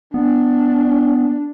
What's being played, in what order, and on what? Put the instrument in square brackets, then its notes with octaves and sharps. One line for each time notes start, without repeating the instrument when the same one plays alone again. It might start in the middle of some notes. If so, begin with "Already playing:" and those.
[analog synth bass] B3 [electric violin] D4